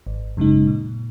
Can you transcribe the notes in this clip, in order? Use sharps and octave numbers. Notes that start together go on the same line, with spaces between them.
G#1
F#2 C#3 G#3 D#4
A#2